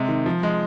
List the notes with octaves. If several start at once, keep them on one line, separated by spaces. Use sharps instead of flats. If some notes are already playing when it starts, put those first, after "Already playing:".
Already playing: C3 G#3
D#3
F3
G#3